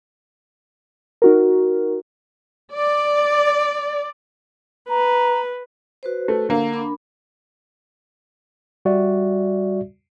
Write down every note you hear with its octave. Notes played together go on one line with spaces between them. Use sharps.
D#4 F#4 A#4
D5
B4 A#5
F#4 B4 C5
A3
D3 A#3
D4 A#4 B5
G3 F#4 D5 E5